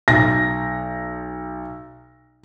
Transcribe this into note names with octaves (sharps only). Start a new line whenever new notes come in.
B1 A#6